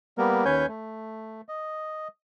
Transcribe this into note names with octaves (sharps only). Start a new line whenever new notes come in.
G3 A#3 B3 A#4
D#2 C#4 B4 C#5 G#5 G6
A3
D#5